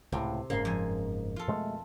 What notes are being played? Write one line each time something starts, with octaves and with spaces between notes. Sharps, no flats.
C#2 A2 C3
F#1 G#2 C#3 A#3 C6
F2 G#5
F4 A4
B2 G#3 A3